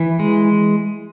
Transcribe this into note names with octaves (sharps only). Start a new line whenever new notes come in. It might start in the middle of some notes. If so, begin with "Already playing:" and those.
Already playing: E3
G#3